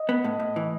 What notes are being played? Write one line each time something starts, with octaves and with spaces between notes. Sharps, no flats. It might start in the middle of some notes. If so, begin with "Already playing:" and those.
Already playing: D#5
B3
A2
A2
E3